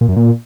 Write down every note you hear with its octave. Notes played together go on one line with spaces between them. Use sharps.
A#2
F#2
A#2